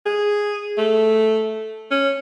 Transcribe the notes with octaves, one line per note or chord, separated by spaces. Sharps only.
G#4
A3
C#4